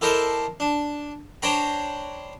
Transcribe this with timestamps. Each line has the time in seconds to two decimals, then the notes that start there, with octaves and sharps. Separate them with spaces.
0.01 E4 G4 A4 A#4 C5 D#5
0.60 D4
1.42 D4 C5 C#5 G5 A#5 B5